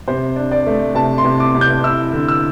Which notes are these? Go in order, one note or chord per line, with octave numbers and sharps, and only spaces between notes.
C3 C5
D4
D5
A3
C3 A5
C6
C3
D6
C3
G6
E4 E6
D3
E6